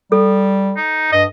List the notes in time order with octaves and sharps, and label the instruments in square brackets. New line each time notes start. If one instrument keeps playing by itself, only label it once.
[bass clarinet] G3 [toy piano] A4
[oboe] D#4
[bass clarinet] G2 [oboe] D#5